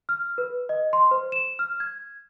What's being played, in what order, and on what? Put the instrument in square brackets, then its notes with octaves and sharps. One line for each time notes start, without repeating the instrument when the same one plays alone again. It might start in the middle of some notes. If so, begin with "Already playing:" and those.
[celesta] F6
B4
D#5
C6
C5
E7
F6
G#6